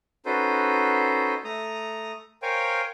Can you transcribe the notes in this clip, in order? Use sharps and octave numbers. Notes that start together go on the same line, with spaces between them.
C#4 D#4 F#4 A4 B4 C5
A3 A#5 D#6
A#4 C5 C#5 F5 G5 G#5